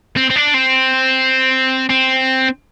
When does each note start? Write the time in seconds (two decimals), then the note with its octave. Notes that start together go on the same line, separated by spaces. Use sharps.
0.17 C4
0.30 C4
0.36 D4
0.54 C4
1.89 C4